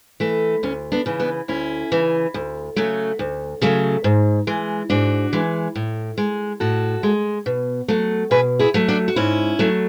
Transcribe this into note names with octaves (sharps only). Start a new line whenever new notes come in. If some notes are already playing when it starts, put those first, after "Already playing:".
E3 A3
D2 C#4
B3 D4
C#3 E3
B3 D4
D2 C#4 E4
C#3 E3
D2
C#3 F#3 A3
D2
C#3 F#3 A3
G#2
E3 G#3
G#2 D4 F#4
E3 G#3
A2
G#3
A2 F#4 A4
G#3
B2
F#3 A3
B2 G#4 B4
E4 G#4
F#3 A3
D4 F#4
F#4
G#2 C#4 E4
F#3 A3